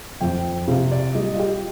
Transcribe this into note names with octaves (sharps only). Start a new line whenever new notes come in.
F2 G5
C3 F5
D5
G3 D#5
F4
G4